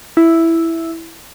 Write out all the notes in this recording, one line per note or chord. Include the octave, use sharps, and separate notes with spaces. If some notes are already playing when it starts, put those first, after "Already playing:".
E4